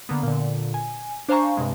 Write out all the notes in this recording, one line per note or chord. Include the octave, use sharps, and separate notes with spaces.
D3 A#3 B3
A#2 D3
G#5
D4 C5 F5 G#5 A#5 C#6
G2 C3 G#3 C4